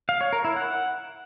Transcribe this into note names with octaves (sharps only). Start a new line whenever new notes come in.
F5
C#5
A#4
E4
F#5